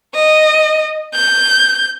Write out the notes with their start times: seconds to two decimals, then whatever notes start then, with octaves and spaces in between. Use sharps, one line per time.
0.15 D#5
1.15 G6